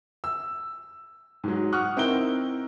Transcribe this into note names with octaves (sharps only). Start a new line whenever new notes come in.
E6
G#2 F#3
F#5 C#6 D#6 F6 F#6
C4 D#4 E4 A#4 D7 G7